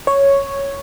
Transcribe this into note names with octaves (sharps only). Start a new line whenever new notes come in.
C#5